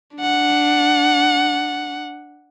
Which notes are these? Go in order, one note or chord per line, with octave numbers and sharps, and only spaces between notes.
D4 F#5